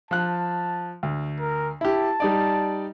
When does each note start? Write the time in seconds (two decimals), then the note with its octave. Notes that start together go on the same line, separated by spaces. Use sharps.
0.11 F3 A5 F#6
1.03 D2
1.40 A#4
1.81 E4 G4 A5
2.20 G3 D#4 D5